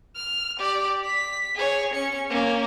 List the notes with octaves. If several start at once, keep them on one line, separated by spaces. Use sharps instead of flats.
F6
G4 D5
B6
G#4 C#5
C#4 C#7
A#3 C#4